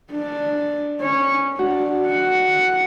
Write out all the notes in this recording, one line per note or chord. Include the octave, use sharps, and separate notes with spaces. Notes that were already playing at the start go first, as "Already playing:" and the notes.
D4
C#4 C#5
D4 F#4
F#5